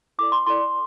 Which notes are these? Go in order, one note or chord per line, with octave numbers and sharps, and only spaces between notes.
E4 A4 D5 D6
C6
E4 A4 D5 C6